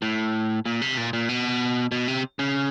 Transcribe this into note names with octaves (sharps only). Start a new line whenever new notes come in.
A2
A#2
C3
A#2
A#2
B2
B2
C3
C#3